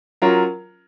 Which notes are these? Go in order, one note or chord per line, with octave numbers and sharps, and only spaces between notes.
F#3 C#4 F4 A#4